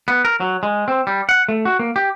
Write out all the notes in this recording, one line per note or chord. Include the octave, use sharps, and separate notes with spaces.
B3
A#4
F#3
G#3
C4
G3
F#5
A3
F#4
A#3
G4